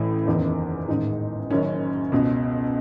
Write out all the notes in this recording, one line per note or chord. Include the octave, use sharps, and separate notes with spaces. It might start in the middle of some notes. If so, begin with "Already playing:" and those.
Already playing: A1 A2 E3
F#1 E2 D#3
A1 G#2 D#3 D#4
F#1 F#2 D#3 C#4
C#2 B2